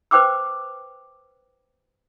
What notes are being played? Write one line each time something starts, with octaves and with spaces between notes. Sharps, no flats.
B4 C5 G5 D6 E6